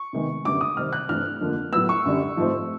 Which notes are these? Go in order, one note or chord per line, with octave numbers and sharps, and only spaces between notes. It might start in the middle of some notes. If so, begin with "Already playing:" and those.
Already playing: C#6
C3 D#3 G#3 B3
F#2 D3 G3 B3 D6
D#6
C3 D#3 G3 C4 F6
F#6
G2 E3 A3 C4 F6
F2 D3 F3 A#3
A2 F#3 B3 E6
C#6
F#2 D3 G3
G#2 F3 A3 C4